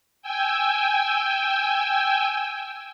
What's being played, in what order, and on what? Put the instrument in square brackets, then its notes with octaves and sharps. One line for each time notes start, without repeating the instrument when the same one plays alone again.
[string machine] G5 G#5 E6